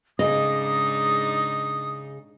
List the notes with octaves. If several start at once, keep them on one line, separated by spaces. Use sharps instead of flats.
G#2 C#3 D4 D#4 G#4 D#5 D#6